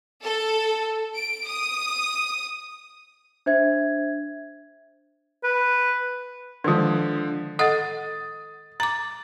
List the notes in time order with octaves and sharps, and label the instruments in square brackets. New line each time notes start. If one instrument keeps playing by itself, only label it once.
[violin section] A4
D7
D#6
[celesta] D4 C5 E5 G#6
[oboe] B4
[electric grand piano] D3 F3 [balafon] D#3 G#3
[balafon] A4 D#5 F#5 [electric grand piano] D#6 A6
[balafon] A#5 D6 [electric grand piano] A6